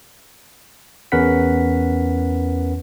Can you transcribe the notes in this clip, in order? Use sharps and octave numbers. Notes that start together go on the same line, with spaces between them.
E2 C#4 A#4 B4 F#5 B6